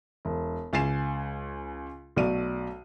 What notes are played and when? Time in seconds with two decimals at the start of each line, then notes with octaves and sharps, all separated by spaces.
0.25 E1
0.73 C#2 G#5 A6 C7 E7
2.16 B1 A3 F#4 D5 D#7